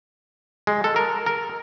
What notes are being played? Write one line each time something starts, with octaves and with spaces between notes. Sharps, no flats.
G#3
A4
A#4
A#4